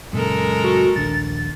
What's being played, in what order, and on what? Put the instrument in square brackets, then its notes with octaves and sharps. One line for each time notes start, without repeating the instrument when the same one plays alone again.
[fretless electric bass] F#2 A#2 C#3 [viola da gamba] G#3 A4 A#4
[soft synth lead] F#4
[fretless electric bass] A#1 D#2 D4 [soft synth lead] A6